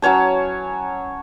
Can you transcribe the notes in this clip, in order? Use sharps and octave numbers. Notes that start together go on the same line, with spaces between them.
F#3 C#4 C#5 A5